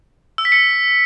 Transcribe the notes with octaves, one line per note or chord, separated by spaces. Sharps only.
E6
B6
C#7